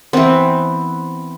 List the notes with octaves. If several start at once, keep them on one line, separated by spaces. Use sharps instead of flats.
E3 B3 C4